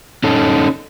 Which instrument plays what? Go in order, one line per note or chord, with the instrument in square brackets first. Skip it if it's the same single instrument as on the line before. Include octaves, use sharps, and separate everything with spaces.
[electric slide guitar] C#4 D#4 A4